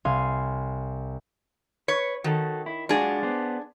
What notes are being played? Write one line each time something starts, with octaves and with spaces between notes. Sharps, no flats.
C2 F5 G#5 C6
B4 C#5
D#3 F#4 A4
E4
G#3 D4 F4 F#4 G#4
B3 C5